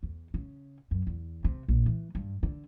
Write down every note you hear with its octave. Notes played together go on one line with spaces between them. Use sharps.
E2
C#3
F#2
E2
C3
A#1
E3
G2
D3